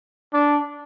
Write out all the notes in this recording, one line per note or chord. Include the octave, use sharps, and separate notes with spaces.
D4